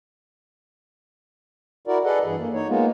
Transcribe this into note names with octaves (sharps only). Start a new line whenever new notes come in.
E4 F#4 A#4 D5
G#4 A4 B4 D5 D#5 F#5
G2 E3 G#4
A#3
D#4 C#5
G#3 A#3 B3 D#4 F4